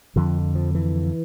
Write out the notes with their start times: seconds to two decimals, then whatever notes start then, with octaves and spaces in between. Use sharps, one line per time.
0.16 F2 D3 F3
0.55 F3
0.75 E3